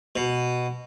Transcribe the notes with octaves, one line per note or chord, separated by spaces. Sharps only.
B2